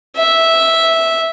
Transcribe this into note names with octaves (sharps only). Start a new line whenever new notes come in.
E5